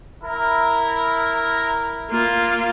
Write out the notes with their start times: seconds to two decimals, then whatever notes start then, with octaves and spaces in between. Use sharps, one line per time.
0.23 E4 A#4
2.11 A#3 F4